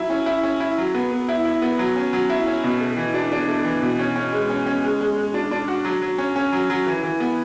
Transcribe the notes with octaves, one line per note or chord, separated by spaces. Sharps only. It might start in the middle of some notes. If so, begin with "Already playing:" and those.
Already playing: F#3 E4
C#4
E4
C#4
E4
F#3
B3
B3
E4
E4
B3
F#3
C#4
F#3
E4
C#4
B2
A3
E3
D4
D4
A3
E3
B2
C#4
C#4
G#3
C#4
C#4
G#3
G#3
G#3
D4
D4
F#4
F#3
F#3
C#4
C#4
F#3
F#3
E3
E3
B3